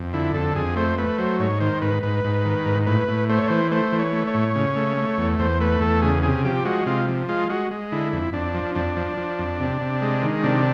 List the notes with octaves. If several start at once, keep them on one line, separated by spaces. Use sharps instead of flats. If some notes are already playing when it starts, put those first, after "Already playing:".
Already playing: F2
D3 E4
F2 A4
F2 G#4
A3 C5
A3 B4
F#3 C5
G#2 C#5
D#3 C5
G#2 B4
G#2 B4
G#2
D#3
G#2
A2 B4
A2
A3 C5
C#5
E3 C5
A3 C5
E3
C#5
A3
C#5
A2
C#3
A3
A3
E2
E2 C5
A3 B4
E2 A4
C#3 G#4
C3 G#4
F3 G4
G#3 F#4
C3 F4
F3
G#3 F4
G#3 F#4
G#3
D3 E4
F2
F2 D4
F3
F2 D4
F3
F3
F2
C3
C3
G#3
D#3
C3 D4